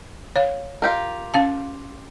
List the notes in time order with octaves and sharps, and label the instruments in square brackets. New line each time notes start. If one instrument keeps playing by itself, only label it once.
[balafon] C#5 F5
[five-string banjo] F4 G4 A#4
[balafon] C#4 F5 A5